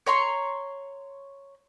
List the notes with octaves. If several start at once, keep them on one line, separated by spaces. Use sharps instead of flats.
C#5 A#5 C6 C#6